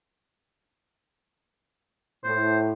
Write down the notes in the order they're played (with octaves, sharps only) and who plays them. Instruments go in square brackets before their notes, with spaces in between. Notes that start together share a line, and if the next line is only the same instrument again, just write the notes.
[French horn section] A2 [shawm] C5